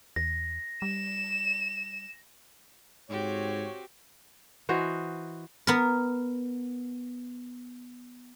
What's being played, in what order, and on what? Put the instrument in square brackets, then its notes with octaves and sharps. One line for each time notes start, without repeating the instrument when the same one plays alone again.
[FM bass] E2 [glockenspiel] A#6
[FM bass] G3 [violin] E7
[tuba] G#2 [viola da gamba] C4 F#4 G4 [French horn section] C#5
[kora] E3 F#4 C5 D#5
[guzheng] B3 A#4